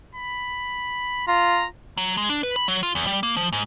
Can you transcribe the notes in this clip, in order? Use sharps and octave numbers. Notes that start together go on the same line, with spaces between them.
B5
F4 A#5
F#3
G#3
D4
B4
B5
F#3
F4
E2
G3
A#3
F3
G#2